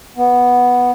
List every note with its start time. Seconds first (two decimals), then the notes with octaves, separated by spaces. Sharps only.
0.17 B3